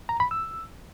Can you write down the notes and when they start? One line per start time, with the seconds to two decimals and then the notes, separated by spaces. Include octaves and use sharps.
0.09 A#5
0.20 B5
0.31 E6